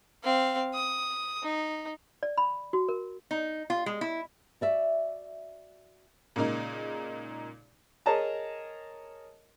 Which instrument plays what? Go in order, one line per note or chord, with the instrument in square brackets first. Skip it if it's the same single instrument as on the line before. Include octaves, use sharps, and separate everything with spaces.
[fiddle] C4 F5
D#6
D#4
[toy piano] D5
B5
F#4
A#4
[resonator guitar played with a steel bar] D#4
F4
G#3
E4
[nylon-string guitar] F#4 D5 E5
[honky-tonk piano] A#2 C#3 G#3 A#3 D#4
[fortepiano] G#4 A#4 C#5 D#5 A5 A#5